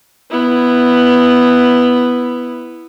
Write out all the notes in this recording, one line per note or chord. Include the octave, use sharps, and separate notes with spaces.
B3 E4